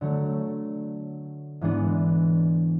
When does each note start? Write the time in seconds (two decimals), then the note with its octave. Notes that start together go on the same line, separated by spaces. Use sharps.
0.01 D3 F#3 A3
1.61 G#2 E3 G#3 B3 D4